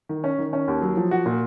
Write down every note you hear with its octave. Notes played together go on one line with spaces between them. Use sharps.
D#3
C#4
D#3
C#4
D#2
F#3
F3
F#4
A#2